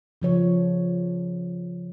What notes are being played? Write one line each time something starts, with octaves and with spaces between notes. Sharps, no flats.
C#3 F3 C#5